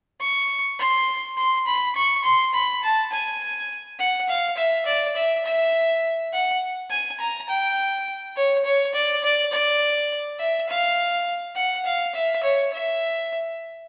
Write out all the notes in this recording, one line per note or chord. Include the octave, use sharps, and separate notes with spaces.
C#6
C6
C6
B5
C#6
C6
B5
A5
G#5
F#5
F5
E5
D5
E5
E5
F#5
G#5
A#5
G5
C#5
C#5
D5
D5
D5
E5
F5
F#5
F5
E5
C#5
E5